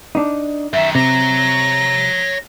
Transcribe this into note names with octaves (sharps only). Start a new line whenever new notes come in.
D4 D#4
F#2 D#3 E5
C3 C#5 A#5 A#6